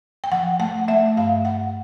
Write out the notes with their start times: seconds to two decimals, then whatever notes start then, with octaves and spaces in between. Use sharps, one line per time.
0.24 G5
0.31 F3 F#5
0.60 A3 F#5
0.88 A3 E5
1.17 G2 F5
1.45 G2 F#5